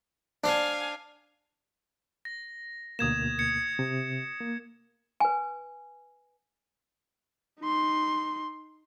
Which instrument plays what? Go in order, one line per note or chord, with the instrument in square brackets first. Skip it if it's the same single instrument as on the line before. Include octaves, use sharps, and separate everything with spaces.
[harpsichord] D4 C5 [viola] F5 G#5
[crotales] A#6
[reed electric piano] D2 B2 A#3 [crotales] D#6 G#6 E7
[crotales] G#6 C#7
[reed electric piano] C3
A#3
[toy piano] B4 G#5
[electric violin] D#4 C6